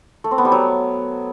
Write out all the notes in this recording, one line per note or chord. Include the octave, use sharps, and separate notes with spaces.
A3
C4
B3
G3
F#3